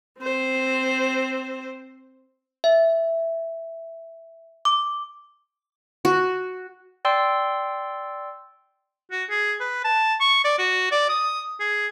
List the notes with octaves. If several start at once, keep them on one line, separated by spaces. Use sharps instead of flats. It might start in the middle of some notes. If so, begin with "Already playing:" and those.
C4 C5
E5
D6
F#4
D5 G5 C6 E6
F#4
G#4
B4
A5
C#6
D5
F#4
D5
D#6
G#4